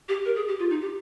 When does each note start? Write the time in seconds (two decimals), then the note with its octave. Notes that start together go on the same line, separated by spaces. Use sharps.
0.09 G4
0.25 A#4
0.36 G#4
0.48 G4
0.59 F4
0.70 D#4
0.81 G4